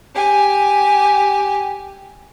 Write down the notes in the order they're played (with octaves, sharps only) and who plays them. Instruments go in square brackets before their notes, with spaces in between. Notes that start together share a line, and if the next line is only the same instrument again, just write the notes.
[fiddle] G4 G#5